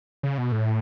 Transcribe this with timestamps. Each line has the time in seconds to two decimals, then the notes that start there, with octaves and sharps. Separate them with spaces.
0.23 C#3
0.38 B2
0.52 A2